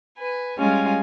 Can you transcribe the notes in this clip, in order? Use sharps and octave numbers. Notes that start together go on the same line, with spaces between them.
B4 G#5
G3 G#3 C#4 F4 G#5